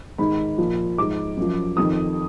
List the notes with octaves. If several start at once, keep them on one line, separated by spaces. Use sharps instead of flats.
G#2 D#3 B5
A#2 F3
G#2 F3 D6
F#2 F3
F2 D#3 D#6